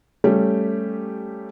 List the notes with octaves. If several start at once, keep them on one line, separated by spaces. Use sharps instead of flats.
G3 A3 C#4 G4